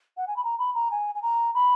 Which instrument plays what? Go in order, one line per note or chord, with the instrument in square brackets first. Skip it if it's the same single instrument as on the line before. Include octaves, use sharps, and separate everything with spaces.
[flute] F#5
G#5
B5
A#5
B5
A#5
G#5
G#5
A#5
B5